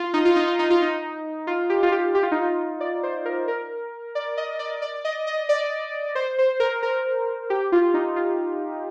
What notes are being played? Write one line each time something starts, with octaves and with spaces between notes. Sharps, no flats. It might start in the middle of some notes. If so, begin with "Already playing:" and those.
Already playing: F4
D#4
F4
D#4
F4
D#4
F4
D#4
F4
G4
F4
G4
G4
F4
D#4
F4
D5
C5
A#4
A#4
D5
D#5
D5
D5
D#5
D#5
D5
C5
C5
A#4
A#4
G4
F4
D#4
F4